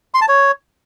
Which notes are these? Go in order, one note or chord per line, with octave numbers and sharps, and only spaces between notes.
C6
A5
C#5